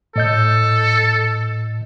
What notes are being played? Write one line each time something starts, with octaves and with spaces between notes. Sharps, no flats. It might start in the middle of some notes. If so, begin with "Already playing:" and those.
A2 A4 D#5 G6